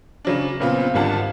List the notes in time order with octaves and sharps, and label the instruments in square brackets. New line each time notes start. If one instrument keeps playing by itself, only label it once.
[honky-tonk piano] C#3 F#3 D4
A#2 C#3 B3 C4 F4
G#1 D3 G3 F4 F#5 A5